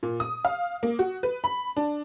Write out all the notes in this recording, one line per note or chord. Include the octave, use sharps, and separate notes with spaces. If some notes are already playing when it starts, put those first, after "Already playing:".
A#2
D#6
F5
A#3
F#4
B4
B5
D4